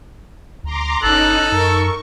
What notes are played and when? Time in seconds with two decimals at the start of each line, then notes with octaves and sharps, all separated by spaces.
0.64 D2 A#5 C6 D6
1.03 G1 C#4 D#4 A4 F#6
1.52 F#2 A#4 C#6